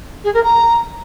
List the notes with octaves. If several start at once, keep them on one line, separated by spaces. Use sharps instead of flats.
G#4
A#4
A#5